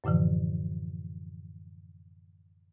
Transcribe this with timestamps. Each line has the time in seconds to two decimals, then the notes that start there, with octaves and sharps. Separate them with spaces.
0.04 F#2 A2 D3 E3 F3